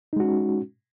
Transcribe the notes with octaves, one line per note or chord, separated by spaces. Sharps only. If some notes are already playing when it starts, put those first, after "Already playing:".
G#3 C#4 D#4 F#4